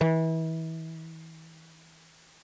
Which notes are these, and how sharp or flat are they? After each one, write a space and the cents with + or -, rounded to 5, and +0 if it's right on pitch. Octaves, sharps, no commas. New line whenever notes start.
E3 -30